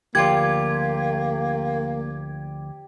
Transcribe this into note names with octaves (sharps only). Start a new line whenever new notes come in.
D2 F3 A#3 F4 G4 D5 G#6